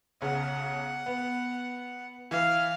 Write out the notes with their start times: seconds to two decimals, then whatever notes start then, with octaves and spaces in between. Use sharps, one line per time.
0.22 B1 C#3 F#5
1.06 B3
2.31 E3 F5